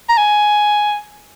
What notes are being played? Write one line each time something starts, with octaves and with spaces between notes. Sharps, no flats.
A#5
G#5